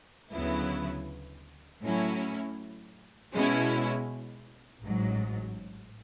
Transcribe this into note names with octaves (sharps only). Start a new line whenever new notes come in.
D2 C#3 F#3 B3 E4
A2 F#3 C#4 E4
B2 G#3 C#4 E4
A1 G#2 F#3